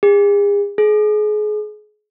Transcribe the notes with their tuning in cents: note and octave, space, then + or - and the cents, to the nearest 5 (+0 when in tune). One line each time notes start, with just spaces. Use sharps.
G#4 -40
G#4 +30